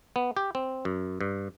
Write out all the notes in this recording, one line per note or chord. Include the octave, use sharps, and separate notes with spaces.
B3
G4
C4
F#2
G2